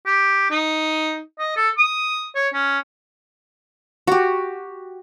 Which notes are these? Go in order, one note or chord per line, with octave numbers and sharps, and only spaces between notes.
G4
D#4
D#5
A4
D#6
C#5
C#4
F#4 G4